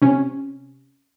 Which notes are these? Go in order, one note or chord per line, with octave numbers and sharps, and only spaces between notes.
C3 C#4